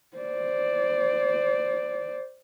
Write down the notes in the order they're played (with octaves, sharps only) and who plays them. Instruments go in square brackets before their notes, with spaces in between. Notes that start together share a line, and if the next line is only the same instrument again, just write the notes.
[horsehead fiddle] C5 D5